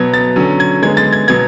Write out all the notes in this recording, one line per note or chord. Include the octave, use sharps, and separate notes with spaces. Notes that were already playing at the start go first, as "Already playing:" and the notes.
Already playing: B2 F#3 B3 G#6
A6
D3 F#3 C#4
G#6
D3 G#3 B3 G#6
A6
G#6
B2 F#3 B3 G#6